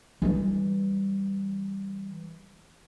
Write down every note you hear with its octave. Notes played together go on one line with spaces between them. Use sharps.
E3 G3